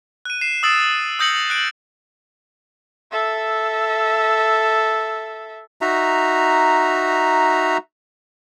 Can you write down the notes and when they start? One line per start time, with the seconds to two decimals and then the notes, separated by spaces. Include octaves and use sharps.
0.25 F#6 D#7
0.41 C7 E7
0.63 D#6 E6 A6 C7 D7 E7
1.19 D#6 E6 G6 A#6 C#7 F#7
1.50 F#6 D7
3.12 A4 E5
5.81 D#4 F#4 E5 A#5